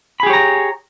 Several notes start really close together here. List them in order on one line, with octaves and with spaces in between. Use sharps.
B5 G#4 G4 C#5 A#5